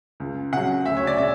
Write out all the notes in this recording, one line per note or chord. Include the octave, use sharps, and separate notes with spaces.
C#2
C#3 F#3 F#5
D2 E5
C#5
D5
C#3 E5